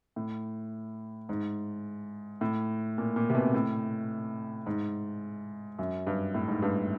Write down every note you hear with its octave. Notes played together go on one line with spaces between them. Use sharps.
A2
G#2
A2
A#2
A#2
C3
B2
A2
G#2
F#2
G2
A2
G#2
G2